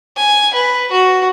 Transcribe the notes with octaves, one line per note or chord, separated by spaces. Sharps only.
G#5
B4
F#4